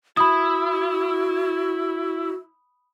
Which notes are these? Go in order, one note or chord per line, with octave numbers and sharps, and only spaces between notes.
E4 F#4 B5 D#6